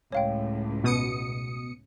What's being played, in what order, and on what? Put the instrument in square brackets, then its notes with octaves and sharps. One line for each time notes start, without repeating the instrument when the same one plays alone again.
[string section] C#2 A2 [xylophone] C#5 F5 G5
[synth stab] B2 D#6 C#7